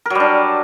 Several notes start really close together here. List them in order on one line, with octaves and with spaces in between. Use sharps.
A#4 F#3 G3 D4